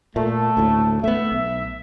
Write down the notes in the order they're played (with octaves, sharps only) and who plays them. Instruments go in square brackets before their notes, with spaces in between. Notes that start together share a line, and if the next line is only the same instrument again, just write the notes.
[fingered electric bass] A#2 [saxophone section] A3
[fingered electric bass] D2 A2
[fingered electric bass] A3 B3 [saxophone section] E5
[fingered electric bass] B1